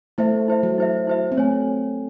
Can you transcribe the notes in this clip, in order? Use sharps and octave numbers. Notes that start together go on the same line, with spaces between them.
A3 E4 C5 E5
E4 C5 E5
F#3
E4 C5 E5
E4 C5 E5
C4
A3 C#5 G#5